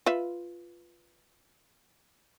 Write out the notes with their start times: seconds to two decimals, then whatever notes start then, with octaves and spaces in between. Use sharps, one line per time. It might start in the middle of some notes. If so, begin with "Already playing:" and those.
0.06 F4 B4 E5